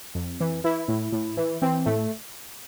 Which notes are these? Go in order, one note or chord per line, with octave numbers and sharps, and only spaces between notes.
F2
E3
E3 E4
A2
A2
E3
E3 C4
A2 A3